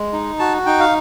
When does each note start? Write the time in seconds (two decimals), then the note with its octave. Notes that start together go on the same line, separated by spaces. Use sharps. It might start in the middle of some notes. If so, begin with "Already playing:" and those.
Already playing: G#3
0.13 D#4
0.39 F#4 A5
0.66 D#4 G5
0.80 F5